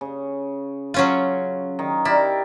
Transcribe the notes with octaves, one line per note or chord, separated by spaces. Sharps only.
C#3
F#3 C#4 F4
D#3
E4 G4 A#4 D5